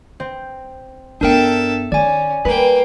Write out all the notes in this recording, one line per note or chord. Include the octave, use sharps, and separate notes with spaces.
C4
G2 B3 D4 A4 A#4 E5 G5
D#3 C#4 D5 G#5
G3 A#3 B4 G5